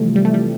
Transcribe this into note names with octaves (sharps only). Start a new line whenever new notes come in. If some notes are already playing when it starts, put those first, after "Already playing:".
Already playing: C3 E3 F3 G3 A3
G3
A3
G3